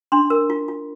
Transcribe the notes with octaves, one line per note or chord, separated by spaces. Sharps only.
D4 C6
A#4
F4
F4